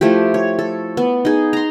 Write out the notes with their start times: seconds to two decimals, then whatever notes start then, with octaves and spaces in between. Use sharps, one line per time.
0.01 F3 A3 E4 G4
0.34 C#5
0.59 A4
0.97 B3
1.25 D#4 G#4
1.53 A#5 C6